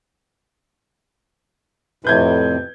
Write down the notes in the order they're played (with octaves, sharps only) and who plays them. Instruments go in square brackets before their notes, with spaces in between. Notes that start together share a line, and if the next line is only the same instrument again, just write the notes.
[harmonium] F2 A2 C3 [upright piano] B4 G6 G#6